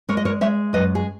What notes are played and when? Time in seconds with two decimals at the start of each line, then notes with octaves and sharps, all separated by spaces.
0.09 G#3 A#4 C#5
0.17 D#5
0.25 A#4 C#5
0.41 G#3 C#5 E5
0.73 F#2 B4 D#5
0.95 G#4